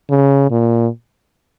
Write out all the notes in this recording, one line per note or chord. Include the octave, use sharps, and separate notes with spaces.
C#3
A#2